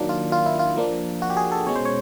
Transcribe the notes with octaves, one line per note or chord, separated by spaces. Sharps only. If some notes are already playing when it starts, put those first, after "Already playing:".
Already playing: D#3 F#3 A#3 D4
F4
F4
E4
F4
F3 A#3 D4
F#4
G4
G#4
A4
B2 G#3 C#4 C#5
C5
C#5